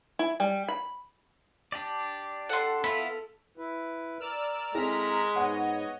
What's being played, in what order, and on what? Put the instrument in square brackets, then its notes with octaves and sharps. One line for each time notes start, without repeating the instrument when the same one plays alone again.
[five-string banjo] E4
G3
B5
[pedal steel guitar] D4 G4 D5
[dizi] A4 [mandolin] F#5 C6
[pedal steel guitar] B3 E4 F4 [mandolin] B5
[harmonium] E4 B4
[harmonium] A#4 [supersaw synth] D5 E6 F6
[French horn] G#3 [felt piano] C4 E4 A4 [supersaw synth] A#5 F6 B6
[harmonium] G#2 B3 [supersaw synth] C#5 D#5 [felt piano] F#5